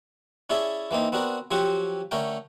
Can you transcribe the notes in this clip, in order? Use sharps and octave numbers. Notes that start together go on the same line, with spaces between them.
C#4 E4 G#4 D5 E5 A5
E3 A#3 C4 D#4
B3 C4 D4 F#4 A#4
F3 F#3 C4 C#4 F#4 G4
D3 A3 C#4 A#4 G5